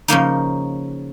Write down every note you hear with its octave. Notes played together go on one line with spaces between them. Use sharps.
C#3 F3 A#3 D#4